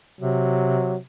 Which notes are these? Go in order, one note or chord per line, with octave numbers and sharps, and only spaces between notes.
C3 F#3